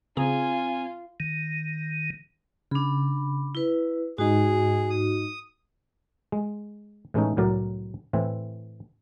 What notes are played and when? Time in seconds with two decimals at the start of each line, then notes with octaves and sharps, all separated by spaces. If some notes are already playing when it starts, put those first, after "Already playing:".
0.17 C#3 C4 F4 G#4 G#5 A#5
1.20 D#3
2.71 C#3 D4 B5
3.55 E4 B4
4.18 G#2 D#4 F#4 G#4
4.90 D#6
6.32 G#3
7.14 A2 E3 G#3 A3 C#4 D#4
7.37 C2 A2 F#3 A#4 D5
8.13 A2 E3 C4